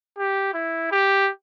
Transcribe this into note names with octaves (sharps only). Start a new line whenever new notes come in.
G4
E4
G4